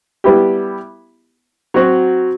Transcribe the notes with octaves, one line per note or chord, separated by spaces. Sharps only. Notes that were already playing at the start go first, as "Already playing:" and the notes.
G3 B3 E4 G4
F#3 C4 F#4